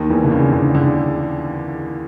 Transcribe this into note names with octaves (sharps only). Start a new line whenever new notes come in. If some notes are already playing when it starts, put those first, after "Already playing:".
Already playing: D#2 D#3
E2 E3
D3
C#3
D3
D3